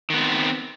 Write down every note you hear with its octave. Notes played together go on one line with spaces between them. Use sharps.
D#3 B3 C4